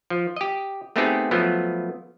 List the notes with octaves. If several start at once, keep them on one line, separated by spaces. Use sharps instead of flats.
F3
G4 D#5
A3 B3 C4 D#4 G4 G#4
F3 F#3 A3 B3